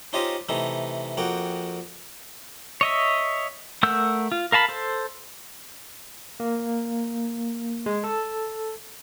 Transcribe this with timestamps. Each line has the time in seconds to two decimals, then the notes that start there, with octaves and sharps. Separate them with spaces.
0.13 C#4 D#4 F4 G4 C5 D#5
0.49 C3 E3 A3 D#4
1.17 F2 A#3 F#4 G5
2.81 C#5 D#5 E5
3.83 A3 A#4 F#5 E6 G6
4.32 F4
4.52 A#4 F5 A5 B5
4.69 A4 C5
6.40 A#3
7.86 G#3
8.04 A4